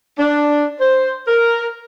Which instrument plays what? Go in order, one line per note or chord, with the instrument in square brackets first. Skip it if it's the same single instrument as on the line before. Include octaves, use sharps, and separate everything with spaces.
[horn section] D4
C5
A#4